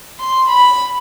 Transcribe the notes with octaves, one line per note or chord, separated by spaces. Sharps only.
C6
B5